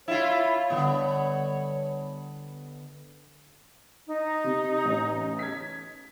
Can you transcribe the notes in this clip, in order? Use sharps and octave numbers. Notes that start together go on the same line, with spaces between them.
E4 F4 C#5
G1 D3 B3 E6
D#4
C3
A1 C#4
G#6 B6